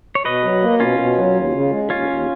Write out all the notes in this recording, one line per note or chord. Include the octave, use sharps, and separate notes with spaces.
C#5
B2 B4 D#5
F#3
A#3
B2 C#4 F4
B2
F#3
D#2
C#3
G#3
D#2 C#4 F4
D#2